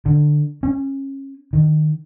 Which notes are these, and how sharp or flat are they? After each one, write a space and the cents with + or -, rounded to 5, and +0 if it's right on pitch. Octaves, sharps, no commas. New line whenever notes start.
D3 +15
C#4 -25
D#3 -20